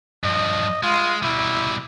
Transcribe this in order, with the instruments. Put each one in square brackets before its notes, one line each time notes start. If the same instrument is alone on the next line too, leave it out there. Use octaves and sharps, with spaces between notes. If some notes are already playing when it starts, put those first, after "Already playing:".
[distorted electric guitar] G2 F3 [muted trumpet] D#5
[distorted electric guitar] G#3 [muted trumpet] F4
[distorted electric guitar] B2 G3 [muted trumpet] E4